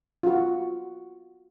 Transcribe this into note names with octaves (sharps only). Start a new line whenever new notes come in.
F4 F#4